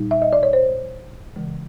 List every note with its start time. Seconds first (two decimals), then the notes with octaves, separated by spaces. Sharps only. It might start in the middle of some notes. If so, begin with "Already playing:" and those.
Already playing: A#2 G3 D#4
0.11 E5
0.22 D#5
0.33 D5
0.43 C#5
0.53 C5
1.36 C#3 E3 G#3